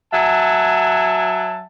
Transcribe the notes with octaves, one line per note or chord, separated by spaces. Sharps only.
F#3 E5 F#5 G#5 A5